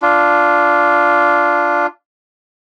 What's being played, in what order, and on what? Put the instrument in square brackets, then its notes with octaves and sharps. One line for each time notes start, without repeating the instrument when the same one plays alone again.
[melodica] D4 F4